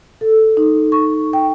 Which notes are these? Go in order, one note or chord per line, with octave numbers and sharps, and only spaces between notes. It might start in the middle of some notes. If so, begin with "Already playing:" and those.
A4
D#4
C#6
G5